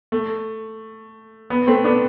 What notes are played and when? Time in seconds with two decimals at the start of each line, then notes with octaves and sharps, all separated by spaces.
0.12 A3
1.50 B3
1.67 A3 C4
1.84 B3 D4